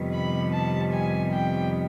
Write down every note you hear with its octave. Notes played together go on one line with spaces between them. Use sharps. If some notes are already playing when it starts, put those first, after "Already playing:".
Already playing: F2 C3 D#3 G3 B3
B5
A5
G#5
G5